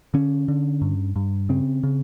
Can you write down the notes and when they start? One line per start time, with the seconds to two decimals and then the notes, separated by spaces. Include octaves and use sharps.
0.14 D3 C#4
0.48 D3
0.82 G2
1.16 G2
1.49 C#3 C4
1.83 C#3